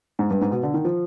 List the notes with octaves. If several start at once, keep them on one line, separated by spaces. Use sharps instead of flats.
G#2
G2
G#2
B2
D3
D#3
F3